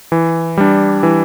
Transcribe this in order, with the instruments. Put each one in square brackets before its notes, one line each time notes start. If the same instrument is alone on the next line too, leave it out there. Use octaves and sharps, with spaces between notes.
[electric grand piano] E3
G3 D4
E3